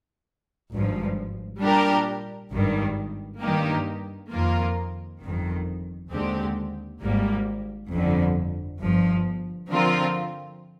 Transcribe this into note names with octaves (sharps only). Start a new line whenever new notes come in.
G#1 G2 F3
A#2 G3 D4 G4 A#4
G#1 G2 D#3 G3
G2 D#3 A#3 D#4 G4
F2 D#3 A#3 F4 A#4
G1 F2 D#3
D#2 D3 G#3 C4 G4
G#1 G#2 G3 A#3
G1 F2 D3
G1 G2 F3
D3 F3 C4 F4 A#4